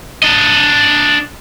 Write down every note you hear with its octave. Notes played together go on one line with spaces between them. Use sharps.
D4 D#5